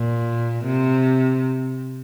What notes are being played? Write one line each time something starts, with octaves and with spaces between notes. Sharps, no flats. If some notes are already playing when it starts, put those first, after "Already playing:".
Already playing: A#2
C3